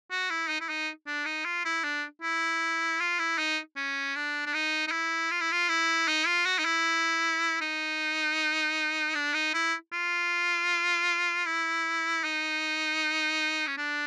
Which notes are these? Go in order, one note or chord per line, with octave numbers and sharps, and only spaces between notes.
F#4
E4
D#4
E4
D#4
D4
D#4
F4
E4
D4
E4
F4
E4
D#4
C#4
D4
D4
D#4
D#4
E4
F4
E4
F4
E4
D#4
F4
F#4
D#4
E4
D#4
D4
D#4
E4
F4
E4
D#4
C#4
D4